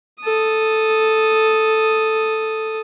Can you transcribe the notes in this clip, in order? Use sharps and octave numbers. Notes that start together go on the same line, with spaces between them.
A4 D#6